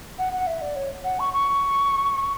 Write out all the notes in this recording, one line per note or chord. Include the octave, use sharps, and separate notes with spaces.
F#5
F#5
E5
D5
C#5
F#5
C#6
C#6